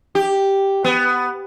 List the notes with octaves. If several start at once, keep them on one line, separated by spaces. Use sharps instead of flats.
G4
B3